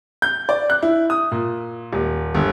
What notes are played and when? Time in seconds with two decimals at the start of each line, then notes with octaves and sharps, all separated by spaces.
0.22 G6
0.49 D5
0.70 F#6
0.83 E4
1.10 D#6
1.32 A#2
1.93 D#1
2.35 G1